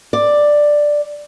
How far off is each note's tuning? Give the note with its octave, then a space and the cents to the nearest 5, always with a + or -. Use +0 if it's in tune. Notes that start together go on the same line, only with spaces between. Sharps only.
D5 +5